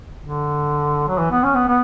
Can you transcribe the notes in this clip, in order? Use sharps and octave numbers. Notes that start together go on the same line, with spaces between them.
D3
F#3
E3
B3
C#4
B3
B3